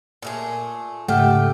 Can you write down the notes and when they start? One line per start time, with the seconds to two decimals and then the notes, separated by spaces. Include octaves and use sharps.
0.22 A#2 A3 G#4
1.08 G#2 C#3 A3 G4 F#5 F6